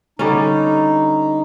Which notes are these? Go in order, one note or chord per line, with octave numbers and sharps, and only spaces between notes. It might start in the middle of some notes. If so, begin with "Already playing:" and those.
D3 G3 C#4 D#4